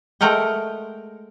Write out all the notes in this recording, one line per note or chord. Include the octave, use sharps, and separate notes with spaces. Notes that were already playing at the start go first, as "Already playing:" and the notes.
G#3 A3 A#4 F#5 G5